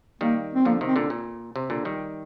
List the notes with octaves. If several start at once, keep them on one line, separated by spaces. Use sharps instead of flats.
D#3 G3 A#3
C4
D3 F3 A#3
C3 D#3
C4
A#2 D3
A#2
C3
A#2 D3
D#3 G3